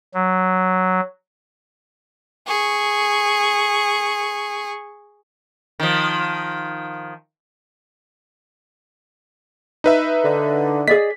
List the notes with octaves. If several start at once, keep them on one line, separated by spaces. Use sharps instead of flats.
F#3
G#4 C#6
D#3 F3
D#4 B4 E5
D3
G#4 D5 D#5 B6